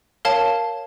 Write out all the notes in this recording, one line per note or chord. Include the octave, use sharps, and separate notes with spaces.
A#4 C#5 F5 A5